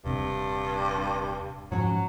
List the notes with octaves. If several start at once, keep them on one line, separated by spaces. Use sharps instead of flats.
D#1 G2 C3 C4
G#2 F3 F#3 C#4